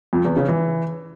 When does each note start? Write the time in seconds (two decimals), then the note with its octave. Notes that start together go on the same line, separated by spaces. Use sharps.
0.13 F2
0.25 E2
0.37 C#3
0.48 E3